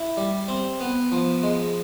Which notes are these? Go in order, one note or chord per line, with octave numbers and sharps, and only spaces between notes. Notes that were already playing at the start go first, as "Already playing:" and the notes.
Already playing: E4
G3
C4
B3
F3
G#3